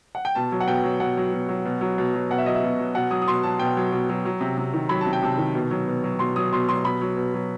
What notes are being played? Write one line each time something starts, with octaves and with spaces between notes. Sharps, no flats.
F#5
G5
B2 A5
F#3
F#5
B2 G5
F#3
B2 F#5
F#3
B2
F#3
B2
F#3
B2
F#3
B2 F#5
E5
F#3 D#5
E5
B2
F#3
B2 F#5
F#3 D#6
D#6
B2 C6
F#3 A5
B2 G5
F#3
B2
F#3
F#3
C3
C3
D#3
F#3 B5
A5
C3
G5
C3 A5
D#3
B2
F#3
B2
F#3
B2 C6
F#3 D#6
B2 C6
F#3 C6
B2 B5
F#3
B2
F#3